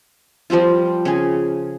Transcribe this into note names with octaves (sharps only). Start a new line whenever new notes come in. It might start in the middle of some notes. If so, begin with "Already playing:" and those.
F3 G3 C4 F4
C#3 G#4